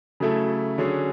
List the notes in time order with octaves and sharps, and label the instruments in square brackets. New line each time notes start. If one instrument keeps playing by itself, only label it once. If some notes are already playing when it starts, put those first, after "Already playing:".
[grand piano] C#3 F#3 A3 E4 A4
D3 F#3 C#4 G#4